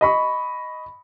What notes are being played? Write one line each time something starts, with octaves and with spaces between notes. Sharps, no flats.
D#5 B5 C#6